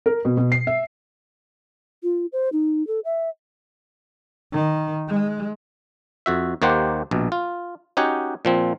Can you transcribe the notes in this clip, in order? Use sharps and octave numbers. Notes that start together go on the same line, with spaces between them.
A#4
B2
B2
C7
E5
F4
C5
D#4
A4
E5
D#3
G#3
F2 F#4 E5
D#2 D#3 A#3 G4 C5 F#5
A#1 B2
F4
C#4 D#4 F#4 G4 C#5 F#5
A#2 F3 C4